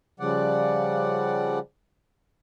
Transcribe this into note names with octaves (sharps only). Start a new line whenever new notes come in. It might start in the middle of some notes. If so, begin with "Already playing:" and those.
C#3 F3 G3 D5 F#5